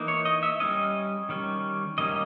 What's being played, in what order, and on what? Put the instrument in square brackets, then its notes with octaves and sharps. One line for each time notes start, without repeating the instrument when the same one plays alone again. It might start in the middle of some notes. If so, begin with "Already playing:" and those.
Already playing: [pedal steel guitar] E3 A#3 D#4
C#5
D#5
E5
G3 C#4 D#5
D#3 G3 C#4
D#3 G3 A#3 C#4 D#5